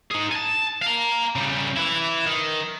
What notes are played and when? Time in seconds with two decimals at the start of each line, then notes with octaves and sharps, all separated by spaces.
0.11 D#4 G#4
0.32 G#5 A5
0.82 F5 A#5
1.36 C#3 G3
1.77 E3 E4
2.26 D#3